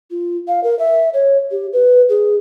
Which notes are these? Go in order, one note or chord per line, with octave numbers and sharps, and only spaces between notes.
F4
F5
A#4
E5
C#5
G4
B4
G#4